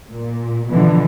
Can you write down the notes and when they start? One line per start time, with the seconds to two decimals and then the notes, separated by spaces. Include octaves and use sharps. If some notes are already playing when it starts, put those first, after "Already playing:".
0.12 A#2
0.69 B2 D3 E3 F3